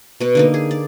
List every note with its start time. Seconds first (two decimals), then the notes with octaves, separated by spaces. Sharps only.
0.20 B2 B4
0.35 D3 A#3 D#4
0.54 G#4
0.71 D5